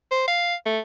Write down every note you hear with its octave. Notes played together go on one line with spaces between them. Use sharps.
C5
F5
A3